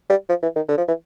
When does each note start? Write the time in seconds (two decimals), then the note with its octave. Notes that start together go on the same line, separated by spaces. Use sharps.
0.10 G3
0.29 F3
0.43 E3
0.56 D#3
0.69 D3
0.78 F3
0.88 E3